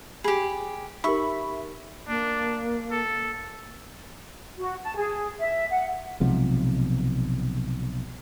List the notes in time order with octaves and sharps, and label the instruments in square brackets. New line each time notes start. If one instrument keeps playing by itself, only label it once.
[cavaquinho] G4 G#4 [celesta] B5
[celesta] D#4 G4 A#4 [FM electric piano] E5 B5 [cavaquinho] C#6
[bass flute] A#3 [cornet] D4
[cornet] A4
[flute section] F#4
A5
G#4
E5
F#5
[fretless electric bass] B1 C3 F3 G#3